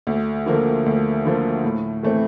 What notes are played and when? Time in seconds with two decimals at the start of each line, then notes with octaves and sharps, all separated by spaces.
0.07 D2
0.46 D3 F3 A#3
0.86 D2
1.25 D3 F3 A#3
1.64 A2
2.03 E3 A3 C4